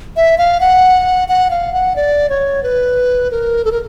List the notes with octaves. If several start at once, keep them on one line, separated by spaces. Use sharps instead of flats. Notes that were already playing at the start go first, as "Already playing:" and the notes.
E5
F5
F#5
F#5
F5
F#5
D5
C#5
B4
A#4
A4
A#4